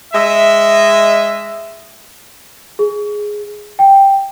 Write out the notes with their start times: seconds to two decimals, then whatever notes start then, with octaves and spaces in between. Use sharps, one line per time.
0.14 G#3 D#5 E5
2.79 G#4
3.79 G5